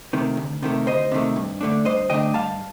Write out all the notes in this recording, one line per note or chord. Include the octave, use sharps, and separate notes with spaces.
C3 D#3 A3
D2
C3 D#3 A3
D2 C5 D#5
C3 D#3 A3
G2
D3 A3 D4
G2 C5 D#5
D3 A3 D4 D#5 G5
G2 F5 A5